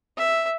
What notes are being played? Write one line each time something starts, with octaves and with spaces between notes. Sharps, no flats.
E5